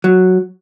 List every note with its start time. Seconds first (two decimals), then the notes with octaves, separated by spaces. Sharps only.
0.04 F#3